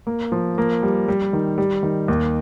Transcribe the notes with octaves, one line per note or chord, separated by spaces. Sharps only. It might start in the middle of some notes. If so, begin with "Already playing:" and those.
A#3
F3
A#3
G3
G3
D#3
G3
D#3
D#2